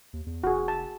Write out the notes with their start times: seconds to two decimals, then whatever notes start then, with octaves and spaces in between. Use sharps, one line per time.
0.13 D#2
0.26 E2
0.44 F1 F#4 G#4
0.68 A5